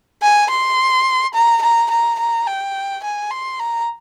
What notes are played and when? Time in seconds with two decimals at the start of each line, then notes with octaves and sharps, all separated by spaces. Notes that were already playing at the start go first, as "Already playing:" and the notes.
0.22 G#5
0.50 C6
1.34 A#5
1.62 A#5
1.90 A#5
2.19 A#5
2.47 G5
3.04 G#5
3.31 C6
3.59 A#5